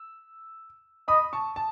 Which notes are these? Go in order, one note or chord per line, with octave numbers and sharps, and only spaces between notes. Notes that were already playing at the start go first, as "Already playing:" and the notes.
Already playing: E6
D#5 B5 D#6
A5 C#6
A5